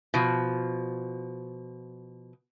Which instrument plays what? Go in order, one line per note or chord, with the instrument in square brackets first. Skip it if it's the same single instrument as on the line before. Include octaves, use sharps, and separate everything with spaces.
[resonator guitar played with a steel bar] B2 F3